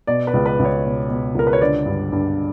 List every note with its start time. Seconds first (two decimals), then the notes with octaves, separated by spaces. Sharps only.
0.07 B2 D5
0.27 B4
0.34 C#2
0.46 B4
0.59 C#2
0.65 C#5
0.85 B2
1.10 B2
1.35 C#2 A#4
1.47 B4
1.53 C#5
1.61 D3 D5
1.86 G2
2.12 G2